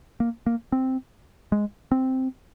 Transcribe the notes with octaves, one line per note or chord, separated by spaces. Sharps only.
A#3
A#3
C4
G#3
C4